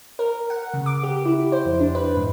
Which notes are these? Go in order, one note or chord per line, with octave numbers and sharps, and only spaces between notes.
A#4
F#5
C#3
D6
G4
E4
C5
F2
D4
B4
G#2